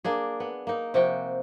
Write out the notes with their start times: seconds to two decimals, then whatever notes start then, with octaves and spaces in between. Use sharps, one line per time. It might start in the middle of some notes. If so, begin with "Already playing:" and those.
0.05 A#3 D4 G#4
0.40 B3
0.67 A#3 D#4
0.94 C3 F3 F#4 G5